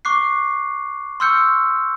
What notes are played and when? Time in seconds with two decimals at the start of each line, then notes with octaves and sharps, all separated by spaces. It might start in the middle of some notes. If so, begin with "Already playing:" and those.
0.05 C#6 D6 F#6 C7
1.20 C6 C#6 E6 F6 G6 C#7